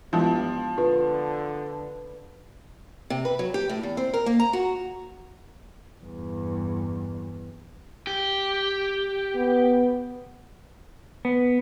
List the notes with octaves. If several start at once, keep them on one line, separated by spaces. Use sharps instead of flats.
G2 F3 G#3 B3 E4
D3 F4 B4
C3
B4
F#3
G4
A2
E2
C4
A#4
A#3
A#5
F#4
E2 G2
G4
B3
B3